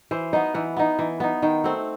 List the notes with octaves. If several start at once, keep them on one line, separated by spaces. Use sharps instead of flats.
E3 C5
B3 D#4 D#5
E3 F#5
B3 D#4
E3
B3 D#4
D#3 G5
A3 C4 F#5